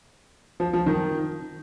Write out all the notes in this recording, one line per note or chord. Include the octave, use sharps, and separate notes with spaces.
F3
F3
D#3